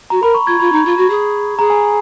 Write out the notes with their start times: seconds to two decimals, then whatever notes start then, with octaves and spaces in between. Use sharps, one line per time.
0.10 F#4 A#5
0.22 A#4 B5
0.34 C#6
0.46 F4 G#6
0.60 F4 B5
0.72 D#4
0.85 F4
0.97 F#4
1.09 G#4
1.58 G#4 A#5
1.70 G#5